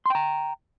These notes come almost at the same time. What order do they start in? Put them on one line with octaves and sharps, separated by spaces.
C6 G5 A#5